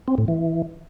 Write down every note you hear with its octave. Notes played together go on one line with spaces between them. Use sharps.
C4
A2
E3